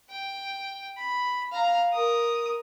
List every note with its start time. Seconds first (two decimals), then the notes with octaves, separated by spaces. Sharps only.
0.10 G5
0.97 B5
1.52 F5 A#5
1.92 A#4 D#6